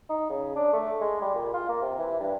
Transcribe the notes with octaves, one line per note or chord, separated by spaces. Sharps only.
D#4
C#3
D4
A3
G#3
G3
A#2
F4
A#3
C3
E3
G2